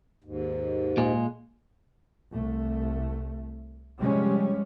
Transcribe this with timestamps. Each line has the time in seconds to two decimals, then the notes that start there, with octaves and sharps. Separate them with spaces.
0.24 D#2 G#2
0.97 A#2 G#3
2.31 C2 A3
4.00 C3 F3 G3 G#3 C#4